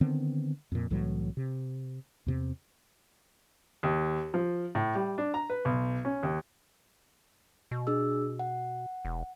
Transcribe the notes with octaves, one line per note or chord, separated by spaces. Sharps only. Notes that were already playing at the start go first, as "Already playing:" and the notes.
D3 D#3 B3 C4
F2 A#2
C2 A2 E3 F#3
C3
E2 C3 C4
D#2
F3
A2
G3
D4
A#5
B4
B1
C#4
D#2
B2
D4 G#4 E6
F#5
E1